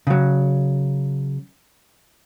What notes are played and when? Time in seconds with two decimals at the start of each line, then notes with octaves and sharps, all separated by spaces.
0.07 C#3 F#3